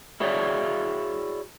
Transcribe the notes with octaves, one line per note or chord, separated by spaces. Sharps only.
E4 F#4 G#4 C#5 D5 E5